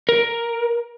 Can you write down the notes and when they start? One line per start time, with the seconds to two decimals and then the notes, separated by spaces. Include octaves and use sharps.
0.09 A#4